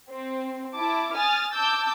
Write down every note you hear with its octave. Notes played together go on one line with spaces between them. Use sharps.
C4
E4 A5 D6
G#5 D#6 F6 A6
A5 D6 E6 G6